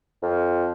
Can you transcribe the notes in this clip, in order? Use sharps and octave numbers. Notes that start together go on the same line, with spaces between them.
F2